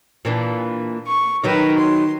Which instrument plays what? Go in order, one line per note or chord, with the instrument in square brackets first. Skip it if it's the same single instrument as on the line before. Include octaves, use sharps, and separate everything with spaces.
[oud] A#2 E3 D4
[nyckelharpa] C#6
[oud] D#3 F#3 D#4 [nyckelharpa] A#4 B4
[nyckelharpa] C6